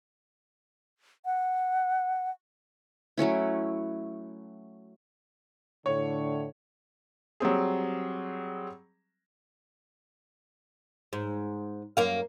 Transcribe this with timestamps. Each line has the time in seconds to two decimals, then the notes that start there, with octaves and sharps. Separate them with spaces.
1.25 F#5
3.17 F#3 A3 C#4 E4
5.86 A2 D3 C#5
7.40 F#3 G3 C4 G#4
11.13 G#2
11.97 F#2 A#3 F5